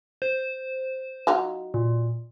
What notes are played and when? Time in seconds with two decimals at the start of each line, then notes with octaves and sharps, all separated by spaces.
0.22 C5
1.27 F#3 D#4 F4
1.74 A#2